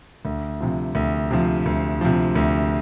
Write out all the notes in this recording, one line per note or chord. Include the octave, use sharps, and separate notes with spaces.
D2
C3 F3
D2
C3 F3
D2
C3 F3
D2